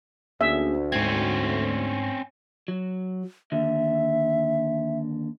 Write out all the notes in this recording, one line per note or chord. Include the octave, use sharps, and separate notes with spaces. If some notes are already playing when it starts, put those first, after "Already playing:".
D2 A#3 C#4 G#4 E5
G#2 C4 C#4 G#6
F#3
D#2 D3 E5